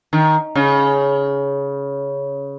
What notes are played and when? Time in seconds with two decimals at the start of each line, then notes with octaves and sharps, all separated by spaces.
0.13 D#3
0.55 C#3